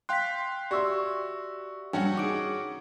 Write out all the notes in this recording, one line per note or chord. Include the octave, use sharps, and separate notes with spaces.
F5 G5 C6 F#6 B6
F#4 G4 D5 E5 C6 C#6 E6
A#1 G2 C#4 F#4 F#5 G5
D#3 G#4 D6 D7